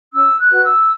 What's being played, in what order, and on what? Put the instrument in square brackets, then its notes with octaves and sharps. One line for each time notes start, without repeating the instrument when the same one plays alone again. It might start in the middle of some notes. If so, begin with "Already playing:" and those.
[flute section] C#4 E6
F#6
F#4 B4
E6